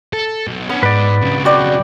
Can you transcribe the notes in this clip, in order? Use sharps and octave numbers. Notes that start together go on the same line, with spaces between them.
A4
B1
B3 C#4 D4
G#2 B4 D5
B1 C#3
F#4 B4 D5 G5